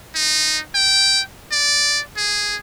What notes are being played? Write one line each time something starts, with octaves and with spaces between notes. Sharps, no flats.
D#4
G5
D5
G#4